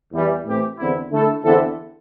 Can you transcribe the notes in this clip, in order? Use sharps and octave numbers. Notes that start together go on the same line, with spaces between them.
E2 E3 G3
A2 E3 C4 G4
E2 D3 C4 E4
D3 A3 E4 A4
E2 D3 C4 E4 A4